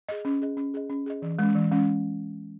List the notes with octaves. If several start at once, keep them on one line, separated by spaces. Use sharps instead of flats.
G#4 D#5
C#4
G#4 D#5
C#4
G#4 D#5
C#4
G#4 D#5
E3
G#3 C#4
E3
G#3 C#4